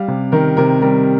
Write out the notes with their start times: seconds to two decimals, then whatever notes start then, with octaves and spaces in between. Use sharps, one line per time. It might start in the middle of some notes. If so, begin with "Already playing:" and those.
Already playing: G3 F5
0.08 C3
0.32 D#3 A#4
0.57 C3 A#4
0.82 G3 A#4